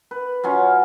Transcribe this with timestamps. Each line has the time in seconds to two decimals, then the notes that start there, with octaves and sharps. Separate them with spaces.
0.11 B4
0.44 F#3 C#4 F4